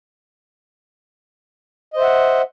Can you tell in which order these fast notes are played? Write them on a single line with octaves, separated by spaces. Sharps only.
D#5 C5 E5 F#5